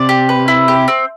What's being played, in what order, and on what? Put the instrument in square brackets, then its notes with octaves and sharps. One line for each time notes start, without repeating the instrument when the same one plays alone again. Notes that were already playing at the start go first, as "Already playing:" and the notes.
Already playing: [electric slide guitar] C3 [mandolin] D5
[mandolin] G4
B4
E4
G4
C4